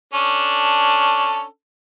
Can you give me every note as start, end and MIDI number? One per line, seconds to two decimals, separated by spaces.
0.14 1.44 61
0.14 1.44 62
0.14 1.44 69